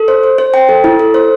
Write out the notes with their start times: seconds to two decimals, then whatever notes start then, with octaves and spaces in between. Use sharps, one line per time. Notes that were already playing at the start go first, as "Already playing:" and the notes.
Already playing: A4
0.08 C5
0.24 C5
0.38 C5
0.54 G5
0.69 A4
0.84 E4
0.99 A4
1.14 C5